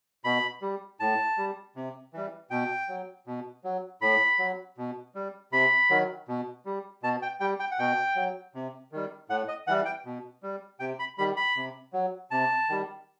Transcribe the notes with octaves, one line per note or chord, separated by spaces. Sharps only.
B2 B5
G3
A2 A5
G3
C3
E3 G3
B2 G5
F#3
B2
F#3
A2 B5
F#3
B2
G3
C3 B5
D#3 F#3
B2
G3
B2 A5
G5
G3 G5
G5
F#5
B2 G5
F#3
C3
D#3 G3
A2 F#5
D#5
E3 G3 F#5
G5
B2
G3
C3 G5
B5
D#3 G3 B5
B5
C3
F#3
C3 A5
D#3 G3